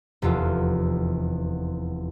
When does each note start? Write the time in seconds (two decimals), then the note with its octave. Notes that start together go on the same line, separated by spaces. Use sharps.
0.22 F1 E2 F4 A4